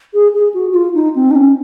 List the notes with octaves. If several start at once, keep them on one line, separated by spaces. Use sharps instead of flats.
G#4
G#4
F#4
F#4
F4
D#4
C4
D#4
C#4